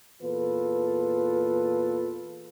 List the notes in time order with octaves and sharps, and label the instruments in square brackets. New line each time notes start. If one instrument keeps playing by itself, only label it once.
[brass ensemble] E2 A#2 F4 A4 B4